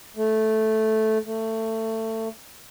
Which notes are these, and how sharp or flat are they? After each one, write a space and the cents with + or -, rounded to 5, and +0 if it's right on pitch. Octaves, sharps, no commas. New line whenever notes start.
A3 -5
A3 +20